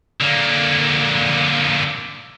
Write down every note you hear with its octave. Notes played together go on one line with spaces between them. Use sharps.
D3 A#3